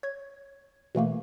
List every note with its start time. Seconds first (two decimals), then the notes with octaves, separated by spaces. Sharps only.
0.03 C#5 G#6
0.95 B2 E3 A3 A#3